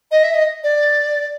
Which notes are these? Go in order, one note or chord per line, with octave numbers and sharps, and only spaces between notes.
D#5
E5
D#5
D5